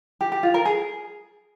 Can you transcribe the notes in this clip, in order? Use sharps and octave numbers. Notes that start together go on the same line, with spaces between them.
G4
G4
F4
A#4
G#4